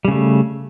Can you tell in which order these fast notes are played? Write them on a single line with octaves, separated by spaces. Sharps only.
G3 C#3 A3